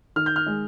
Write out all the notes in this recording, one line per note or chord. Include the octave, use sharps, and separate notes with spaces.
D#3 F6
G6
F6
G#3